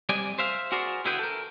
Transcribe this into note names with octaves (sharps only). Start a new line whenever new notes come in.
G3 C4 D5 D#5 G#5
C5 E5 F5
F#4 G#4 A#4 C5 D5
D3 E4 F#4 G#4 B4 G5
A4 A#4